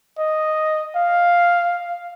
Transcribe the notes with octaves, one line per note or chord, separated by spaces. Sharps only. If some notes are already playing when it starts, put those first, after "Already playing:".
D#5
F5